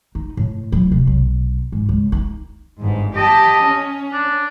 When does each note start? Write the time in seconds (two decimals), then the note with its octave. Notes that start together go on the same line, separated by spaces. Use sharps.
0.15 D#4
0.37 A2
0.72 D1
0.92 C3
1.07 B1
1.72 G#2
1.89 C#2
2.12 D#4
2.82 G1 G#2
3.17 G4 D#5 A5
3.65 C#4
4.13 D4